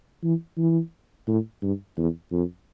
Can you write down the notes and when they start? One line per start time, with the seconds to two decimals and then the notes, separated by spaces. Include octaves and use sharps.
0.23 E3
0.58 E3
1.27 A2
1.62 G2
1.97 E2
2.32 F2